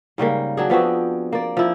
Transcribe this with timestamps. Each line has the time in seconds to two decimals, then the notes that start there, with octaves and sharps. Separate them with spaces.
0.18 G#2 C#3 G3 A#3
0.57 F#3 D4 G#4
0.70 F3 B3 C4 F#4
1.33 A#3 D5
1.57 F3 E4